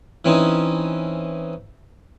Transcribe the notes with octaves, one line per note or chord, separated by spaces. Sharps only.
E3 C4 C#4 D#4